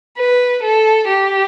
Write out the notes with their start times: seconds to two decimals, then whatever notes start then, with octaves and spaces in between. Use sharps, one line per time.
0.18 B4
0.63 A4
1.08 G4